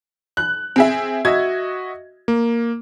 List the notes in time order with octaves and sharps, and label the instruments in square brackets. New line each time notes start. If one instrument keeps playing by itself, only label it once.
[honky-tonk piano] F#6
C4 G#4 E5
[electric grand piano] F#4 D#5 E5 [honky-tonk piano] G#6
[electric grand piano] A#3